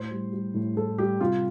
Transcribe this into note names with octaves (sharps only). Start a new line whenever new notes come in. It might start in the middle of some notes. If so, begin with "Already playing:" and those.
Already playing: A2 C5
G3
G3
A2
A2 A4
G3 G4
C3 F4